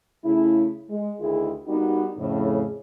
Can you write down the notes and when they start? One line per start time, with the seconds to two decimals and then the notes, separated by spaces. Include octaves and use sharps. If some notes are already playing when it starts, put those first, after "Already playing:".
0.25 C#3 A3 E4
0.89 G#3
1.20 D2 D#3 E4 F4 G#4
1.67 G3 A#3 B3 D#4 F#4
2.17 F2 A2 C#3